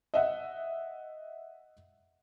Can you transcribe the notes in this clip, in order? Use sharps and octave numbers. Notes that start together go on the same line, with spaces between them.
D#5 E5 F#5